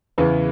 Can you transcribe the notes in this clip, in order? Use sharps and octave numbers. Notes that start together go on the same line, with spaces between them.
E2 C#3 E3 B3